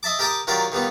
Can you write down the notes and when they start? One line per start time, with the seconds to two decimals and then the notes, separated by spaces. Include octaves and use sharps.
0.03 D#5 E5 A5 D6
0.19 G4 A#4 G5 A5 D6 D#6
0.47 D#3 F#3 F4 G4 A#4 D5
0.72 D#3 G3 B3 F4